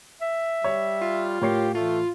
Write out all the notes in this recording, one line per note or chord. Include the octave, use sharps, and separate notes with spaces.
E5
G3 C#5
F4
A2 G4 A#4 C#5 C7
E3 A3 F4